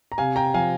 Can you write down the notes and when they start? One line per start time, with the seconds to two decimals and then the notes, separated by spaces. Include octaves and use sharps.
0.12 A#5
0.18 C3 F5 G#5
0.36 G5 A#5
0.54 F3 F5 G#5